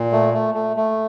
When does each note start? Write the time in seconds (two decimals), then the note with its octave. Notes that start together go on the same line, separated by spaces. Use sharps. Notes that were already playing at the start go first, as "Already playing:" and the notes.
Already playing: A#2
0.12 A3
0.34 A3
0.55 A3
0.77 A3